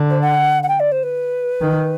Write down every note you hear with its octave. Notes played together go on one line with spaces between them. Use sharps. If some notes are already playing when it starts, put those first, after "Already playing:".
Already playing: D3
C5
F#5
F#5
G5
D5
C5
B4
D#3